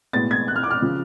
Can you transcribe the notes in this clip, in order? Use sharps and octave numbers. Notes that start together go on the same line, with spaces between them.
B1 A2 G#3 B3 A6
G#6
F#6
F6
D6
F6
C#3 F3